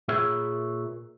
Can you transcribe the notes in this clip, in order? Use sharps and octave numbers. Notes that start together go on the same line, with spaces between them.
A#2 G#4 B4 C#5 E5